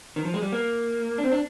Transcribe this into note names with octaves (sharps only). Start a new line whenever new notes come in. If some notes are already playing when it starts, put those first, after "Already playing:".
D#3
F3
G#3
G3
A#3
D4
C4
D4